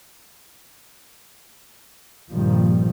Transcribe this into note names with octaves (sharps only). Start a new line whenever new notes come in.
A#1 G2 A#2 D#3 F3 G3